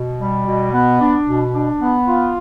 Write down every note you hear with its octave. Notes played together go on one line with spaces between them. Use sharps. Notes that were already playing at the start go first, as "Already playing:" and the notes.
Already playing: B2
G3
B2
B3
D4
B2
D4
B3
F4